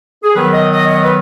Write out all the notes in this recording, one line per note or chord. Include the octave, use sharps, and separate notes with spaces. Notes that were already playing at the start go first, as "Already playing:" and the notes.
G#4
D#3 F#3 B3 B4
D#5
D#5
C#5
D#5
B4